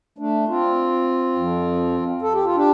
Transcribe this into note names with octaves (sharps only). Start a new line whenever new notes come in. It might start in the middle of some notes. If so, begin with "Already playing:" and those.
A3 D4
C4 F4
F2 F3
A4
G4
F4
D4 G4